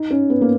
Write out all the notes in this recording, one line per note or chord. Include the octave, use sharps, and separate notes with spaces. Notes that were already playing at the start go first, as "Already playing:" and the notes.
Already playing: D#4
C#4
B3
A#3